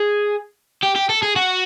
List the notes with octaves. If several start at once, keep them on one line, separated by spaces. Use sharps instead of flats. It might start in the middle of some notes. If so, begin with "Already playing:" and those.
Already playing: G#4
G4
G4
A4
G#4
F#4